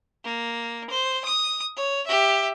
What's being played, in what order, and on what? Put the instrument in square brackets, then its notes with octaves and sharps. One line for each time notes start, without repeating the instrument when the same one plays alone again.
[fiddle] A#3
C5
D#6
C#5
G4 E5